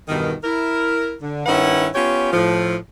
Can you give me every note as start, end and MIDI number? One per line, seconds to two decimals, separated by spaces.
0.09 0.33 40
0.09 0.33 43
0.09 0.33 47
0.09 0.33 51
0.44 1.15 64
0.44 1.15 70
1.22 1.42 50
1.46 1.88 43
1.46 1.88 51
1.46 1.88 61
1.46 1.88 64
1.46 1.88 71
1.46 1.88 78
1.95 2.30 59
1.95 2.30 61
1.95 2.30 65
1.95 2.30 67
1.95 2.30 73
2.32 2.76 45
2.32 2.76 53